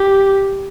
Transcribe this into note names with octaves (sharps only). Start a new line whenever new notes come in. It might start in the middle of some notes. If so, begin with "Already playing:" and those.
Already playing: G4